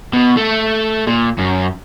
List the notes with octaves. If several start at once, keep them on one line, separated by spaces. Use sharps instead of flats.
B2
A3
A#2
F#2